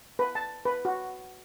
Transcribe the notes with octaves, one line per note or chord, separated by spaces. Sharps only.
B4
A5
B4
F#4